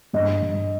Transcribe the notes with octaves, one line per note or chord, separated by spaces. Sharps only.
G2 D#5
G2